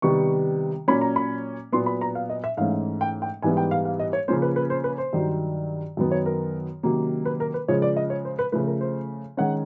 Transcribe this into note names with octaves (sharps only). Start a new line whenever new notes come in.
C3 D#3 G3 B3 C#6
A#2 F#3 A#3 C#4 B5
A#5
B5
A#2 F#3 B3 C6
B5
A#5
F5
D#5
E5
G#2 E3 A3 C#4 F5
G5
G5
G#2 E3 G3 B3 G#5
G5
F5
F5
D#5
C#5
C#3 F3 A#3 C#4 C5
B4
B4
C5
B4
C5
G2 D#3 F#3
F#2 D#3 F#3 B3
C#5
A#4
C3 D#3 F#3 A#3 C#4
B4
A#4
B4
C#3 F3 G#3 C#5
D5
D#5
C#5
C5
B4
C#3 F3 A3 B4
A#4
C5
D#3 G#3 C#4 F#5